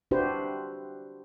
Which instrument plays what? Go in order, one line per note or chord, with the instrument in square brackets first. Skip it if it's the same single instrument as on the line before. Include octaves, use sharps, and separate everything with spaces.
[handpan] D4 E4 F#4 G4 B4 C5